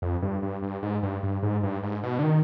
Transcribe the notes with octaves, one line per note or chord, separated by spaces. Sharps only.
F2
G2
G2
G2
G#2
G2
G2
G#2
G2
G#2
B2
D3
D#3